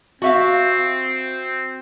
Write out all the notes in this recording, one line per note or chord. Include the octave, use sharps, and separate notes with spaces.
C4 F#4 E5 F5